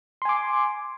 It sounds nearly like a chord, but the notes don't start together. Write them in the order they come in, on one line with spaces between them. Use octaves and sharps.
C6 G#5 D6